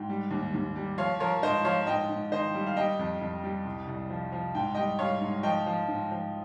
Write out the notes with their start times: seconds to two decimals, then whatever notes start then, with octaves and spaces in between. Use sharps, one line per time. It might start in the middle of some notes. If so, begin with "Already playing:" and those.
Already playing: G#2 G5
0.09 G3
0.31 D#2
0.54 D#2
0.76 G3
0.98 F3 C#5 F5
1.20 F3 A#4 C#5
1.42 G#2 C5 D#5
1.65 F3 C#5 F5
1.87 G#2 D#5 G5
2.10 G#2
2.32 D#3 C5 D#5
2.54 G3
2.66 F5
2.76 G3 D#5 G5
2.99 F2
3.21 F2
3.43 G3
3.65 C2
3.87 C2
4.10 F3
4.32 F3
4.55 G#2 G5
4.74 G3 D#5 G5
4.99 G3 C#5 F5
5.21 G#2
5.43 F3 D#5 G5
5.66 F3
5.88 G#2
6.11 F3